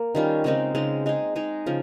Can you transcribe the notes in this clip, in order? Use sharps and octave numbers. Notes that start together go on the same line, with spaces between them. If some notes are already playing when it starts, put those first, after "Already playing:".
Already playing: A#3
D#3 G3 C#4 F4
C#3 G#3 C4 D#4
C#3 G#3 C4 D#4
G#3 D#4 G#4
G#3 D#4 G#4
C#3 F3